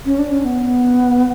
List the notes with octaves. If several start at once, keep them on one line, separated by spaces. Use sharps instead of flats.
C#4
D4
C#4
B3